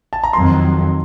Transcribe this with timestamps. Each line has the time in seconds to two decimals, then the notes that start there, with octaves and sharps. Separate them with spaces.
0.13 A5
0.24 A#5
0.33 F2 D#3 F#3 C6